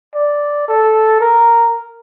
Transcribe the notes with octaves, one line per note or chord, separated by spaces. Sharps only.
D5
A4
A#4